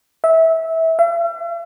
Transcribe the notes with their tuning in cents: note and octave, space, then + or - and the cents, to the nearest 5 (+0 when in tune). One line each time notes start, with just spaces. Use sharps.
E5 -20
E5 +45